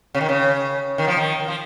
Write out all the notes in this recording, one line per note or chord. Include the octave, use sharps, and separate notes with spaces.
C#3
D#3
C#3
D#3
F3
D#3
D#3
F3